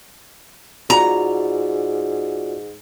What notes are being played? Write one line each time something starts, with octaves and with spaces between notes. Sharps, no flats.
G#2 F4 F#4 D5 A#5